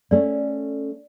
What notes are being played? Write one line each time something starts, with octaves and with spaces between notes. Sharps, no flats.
A3 C#4 D5